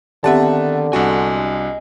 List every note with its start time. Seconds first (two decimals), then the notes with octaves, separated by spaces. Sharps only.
0.24 D3 D#3 B3 C4 G4 E5 F#5 A5
0.93 C2 D4 F#4 D#5 G#5